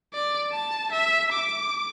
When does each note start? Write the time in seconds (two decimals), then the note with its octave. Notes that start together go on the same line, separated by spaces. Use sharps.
0.14 D5
0.51 A5
0.92 E5
1.32 D6